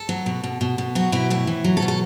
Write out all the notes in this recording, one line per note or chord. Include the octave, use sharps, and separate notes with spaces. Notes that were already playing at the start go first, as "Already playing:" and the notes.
Already playing: A4
F#3
B2
B2
B2
B2
F#3 F#4
B2 E4
A2 E4
E3
F#3
A4
B2
A4